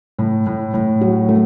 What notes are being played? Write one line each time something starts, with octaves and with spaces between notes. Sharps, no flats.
A2
A2
A2
F#3
A3